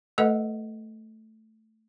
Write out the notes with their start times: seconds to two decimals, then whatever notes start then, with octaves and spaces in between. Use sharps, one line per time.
0.18 A3 A4 B4 D#5 F#5